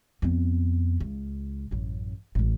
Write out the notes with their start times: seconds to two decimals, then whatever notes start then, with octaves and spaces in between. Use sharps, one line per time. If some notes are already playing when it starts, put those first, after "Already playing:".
0.22 F2 B3
1.00 C#2
1.71 A1 F#2
2.35 A1 D2